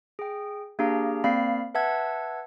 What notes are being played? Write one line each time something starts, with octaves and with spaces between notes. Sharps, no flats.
G#4 G5
A#3 D4 G4 G#4 F5 A#5
A#3 C4 D5 F5 B5 C7
B4 E5 F#5 A5 E6 G#6